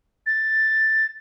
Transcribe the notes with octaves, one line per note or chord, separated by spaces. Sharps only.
A6